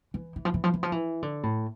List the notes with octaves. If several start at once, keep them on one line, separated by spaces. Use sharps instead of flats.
E3
E3
F3
E3
F3
E3
F3
E3
D3
A2